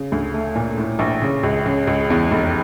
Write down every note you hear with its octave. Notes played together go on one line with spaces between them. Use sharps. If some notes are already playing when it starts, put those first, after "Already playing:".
Already playing: C#3
D2
A3
A#2
A2
A#1
C#3
C#2
C#3
C#2
E2
F1